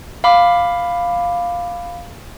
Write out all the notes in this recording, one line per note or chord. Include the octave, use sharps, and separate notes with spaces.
F5 B5 D6